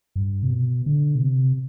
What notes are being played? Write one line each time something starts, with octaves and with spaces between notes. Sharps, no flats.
G2
C3
B2
D3
B2
C3